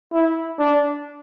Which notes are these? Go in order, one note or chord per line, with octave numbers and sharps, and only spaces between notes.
E4
D4